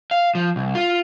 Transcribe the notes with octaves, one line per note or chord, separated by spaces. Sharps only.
F5
F3
C2
F4